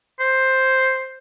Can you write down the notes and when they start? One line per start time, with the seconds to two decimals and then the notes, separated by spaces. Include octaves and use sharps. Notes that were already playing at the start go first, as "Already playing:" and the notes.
0.20 C5